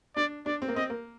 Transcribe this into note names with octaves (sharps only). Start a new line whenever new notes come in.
D4 D5
D4 D5
C4
A#3
C4 D#5
A#3